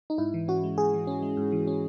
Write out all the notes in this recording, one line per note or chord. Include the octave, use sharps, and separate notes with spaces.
D#4
G#2 E4
E3
C#4 F#4
G#3
G#2 G#4
E3
C#4
G#3
G#2
E3
C#4